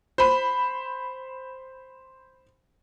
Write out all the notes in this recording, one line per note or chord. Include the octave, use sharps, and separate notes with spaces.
C5 B5